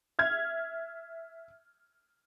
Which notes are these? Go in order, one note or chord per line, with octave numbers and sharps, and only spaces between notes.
E5 F6 G#6